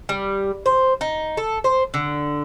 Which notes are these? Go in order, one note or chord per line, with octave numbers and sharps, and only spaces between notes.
G3
C5
D#4
A4
C5
D3